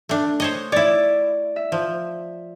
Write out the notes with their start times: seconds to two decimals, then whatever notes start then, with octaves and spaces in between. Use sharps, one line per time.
0.09 A3 D4
0.40 C5 C#5 D#5
0.72 E4 C#5 D5
1.56 E5
1.72 F3